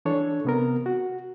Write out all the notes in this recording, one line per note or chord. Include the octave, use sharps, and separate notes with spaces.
E3 D4 A4 C#5
C3 B3 A#4
F#4